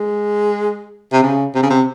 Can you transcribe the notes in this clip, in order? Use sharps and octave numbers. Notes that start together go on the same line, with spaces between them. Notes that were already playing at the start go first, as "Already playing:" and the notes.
Already playing: G#3
C3
C#3
C3
C#3
C3